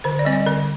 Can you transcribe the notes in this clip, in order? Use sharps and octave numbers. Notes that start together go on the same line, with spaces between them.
D3 C5
D5
G3 C4 D#5
D5
D3 A#4